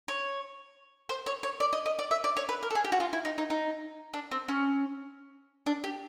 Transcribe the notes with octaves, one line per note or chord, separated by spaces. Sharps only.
C#5
C5
C#5
C#5
D5
D#5
D#5
D5
E5
D5
C#5
B4
A#4
A4
G#4
G4
F#4
F4
E4
D#4
D#4
D#4
D4
C4
C#4
D4
G4